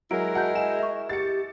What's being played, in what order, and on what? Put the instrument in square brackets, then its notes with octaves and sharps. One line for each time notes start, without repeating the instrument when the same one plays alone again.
[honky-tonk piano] F#3 [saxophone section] G#3 E4 A#4 [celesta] D7
[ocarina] F#4 [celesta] D#5 A5 G6 [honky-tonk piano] F#5
[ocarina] D#5 [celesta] G#5 [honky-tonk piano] E7
[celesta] E5 C#6
[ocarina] G4 [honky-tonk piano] A6 C#7